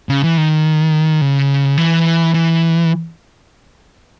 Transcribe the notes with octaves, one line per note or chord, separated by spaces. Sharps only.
C#3
E3
D#3
C#3
E3
E3